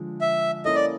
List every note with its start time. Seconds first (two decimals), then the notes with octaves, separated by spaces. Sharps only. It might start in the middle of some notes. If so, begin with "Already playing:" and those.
Already playing: D3 F3 G#3
0.21 E5
0.65 A#3 C#4 E4 A4 D#5
0.75 D5